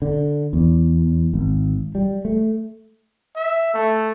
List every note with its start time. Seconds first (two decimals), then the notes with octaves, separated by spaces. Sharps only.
0.02 D3
0.53 E2
1.34 G#1
1.95 G3
2.25 A3
3.36 E5
3.74 A3